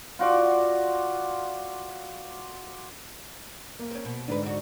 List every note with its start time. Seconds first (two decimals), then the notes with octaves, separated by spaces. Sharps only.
0.19 F4 F#4 D5 F#5
3.79 A#3
3.91 C4 C#4
4.05 B2
4.28 G#2 D3 D4 B4
4.43 D4 F#4